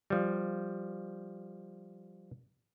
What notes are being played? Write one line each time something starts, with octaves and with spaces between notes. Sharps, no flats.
F3 G3